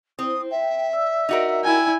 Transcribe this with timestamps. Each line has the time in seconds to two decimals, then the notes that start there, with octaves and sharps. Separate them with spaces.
0.19 C4 E4 C5 D#6
0.51 E5 G5
0.93 D5 E6
1.29 D#4 F#4 A#4
1.64 E4 G5 G#5